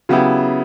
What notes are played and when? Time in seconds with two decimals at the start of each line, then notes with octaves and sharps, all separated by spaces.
0.09 C#3 F#3 B3 E4 G4